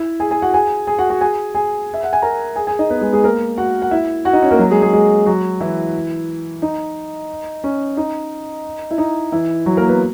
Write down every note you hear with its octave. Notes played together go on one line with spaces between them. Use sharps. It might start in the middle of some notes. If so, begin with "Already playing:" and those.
Already playing: E4 E5
G#4 G#5
G#4 G#5
F#4 F#5
G#4 G#5
G#4 G#5
F#4 F#5
F#4 F#5
G#4 G#5
G#4 G#5
E5
F#5
G#5
A#4 A#5
G#4 G#5
G#4 G#5
D#4 D#5
B3 B4
G#3 G#4
G#3 G#4
A#3 A#4
F#4 F#5
F#5
E4 E5
F#4 F#5
D#4 D#5
C#4 C#5
A#3 A#4
F#3 F#4
G#3 G#4
G#3 G#4
G#3 G#4
F#3 F#4
E3 E4
D#4
C#4
D#4
E4
D#4
E3 E4
F#3 F#4
A#3 A#4
B3 B4